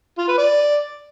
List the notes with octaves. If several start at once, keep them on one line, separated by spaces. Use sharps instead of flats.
F4
B4
D5